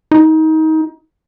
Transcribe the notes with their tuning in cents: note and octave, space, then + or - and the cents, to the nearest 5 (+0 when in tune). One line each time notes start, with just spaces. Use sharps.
D#4 +25